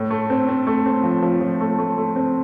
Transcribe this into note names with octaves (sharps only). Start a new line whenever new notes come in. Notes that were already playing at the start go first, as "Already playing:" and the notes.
Already playing: A2
A3
C4
C4
A3
C4
F3
F3
F3
A3
A3
A3
C4